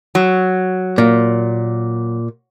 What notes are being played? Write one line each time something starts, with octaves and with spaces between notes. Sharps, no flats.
F#3
A#2